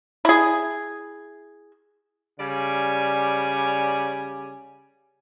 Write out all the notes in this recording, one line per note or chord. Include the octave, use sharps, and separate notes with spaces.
E4 G#4
C#3 G3 D5 G#5